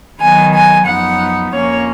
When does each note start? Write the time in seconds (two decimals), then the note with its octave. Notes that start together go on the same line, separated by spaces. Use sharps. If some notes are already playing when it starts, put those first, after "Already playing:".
0.21 D#3 F#3 B3 G#5
0.54 G#5
0.87 F#2 F3 B3 D#4 F#5
1.54 F2 F3 A#3 C#4 C#5